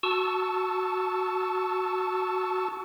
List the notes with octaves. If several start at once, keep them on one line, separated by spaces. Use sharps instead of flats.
F#4 A5 C#6 E6